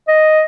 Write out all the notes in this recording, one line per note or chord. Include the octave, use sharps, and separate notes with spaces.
D#5